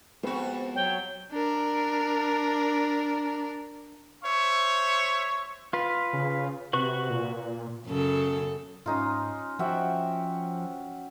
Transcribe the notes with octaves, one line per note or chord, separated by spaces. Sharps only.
F2 G#3 B3 C4 F#4
F#3 C#5 G5
D4 A#4
C5 C#5 E5 C#6
F4 B4
C#3
C3 F#4 B4 C#6
A#2
F#2 C#3 A4
G#2 C#4 D#4 F4
F3 F#4 E5 G5